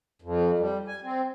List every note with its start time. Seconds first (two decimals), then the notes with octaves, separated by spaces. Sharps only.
0.22 F2
0.59 G3
0.87 G#5
1.03 C4